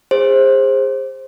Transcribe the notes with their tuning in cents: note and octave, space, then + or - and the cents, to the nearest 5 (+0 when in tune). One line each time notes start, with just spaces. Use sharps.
G#4 -30 C5 +20